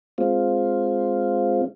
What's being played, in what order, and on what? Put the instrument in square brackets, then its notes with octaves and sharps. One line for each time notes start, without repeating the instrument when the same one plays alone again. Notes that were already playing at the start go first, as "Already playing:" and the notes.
[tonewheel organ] G#3 C4 F4